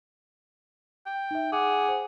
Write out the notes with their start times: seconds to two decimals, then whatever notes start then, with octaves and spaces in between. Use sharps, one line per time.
1.06 G5
1.31 D#4 E5
1.52 G#4 F#5 D6
1.89 C5